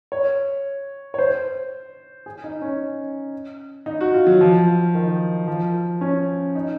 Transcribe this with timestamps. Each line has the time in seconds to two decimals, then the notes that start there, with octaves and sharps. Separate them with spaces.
0.12 C#5
1.14 C#5
1.18 C5
2.26 G#4
2.44 D#4
2.62 C#4
3.86 D#4
4.01 F#4
4.14 F4
4.27 F#3
4.41 F3
4.95 D#3
5.48 F3
6.01 C#4
6.55 D#4